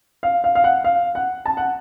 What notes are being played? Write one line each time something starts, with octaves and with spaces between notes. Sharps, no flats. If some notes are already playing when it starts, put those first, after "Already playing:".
F5
F5
F5
F#5
F5
F#5
A5
F#5